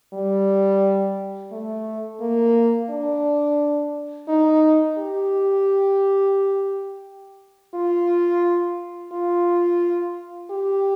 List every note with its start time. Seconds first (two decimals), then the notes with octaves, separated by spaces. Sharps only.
0.13 G3
1.52 A3
2.21 A#3
2.90 D4
4.28 D#4
4.98 G4
7.75 F4
9.12 F4
10.51 G4